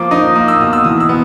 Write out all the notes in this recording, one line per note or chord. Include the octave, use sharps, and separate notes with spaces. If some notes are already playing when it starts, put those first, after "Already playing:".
Already playing: F3 A#3 D6
D#4 D#6
A#3 D#6
E6
B2 D#6
E6
E3 D#6
E6
B3